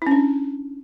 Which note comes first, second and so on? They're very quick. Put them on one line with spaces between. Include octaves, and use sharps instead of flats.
E4 C#4 D4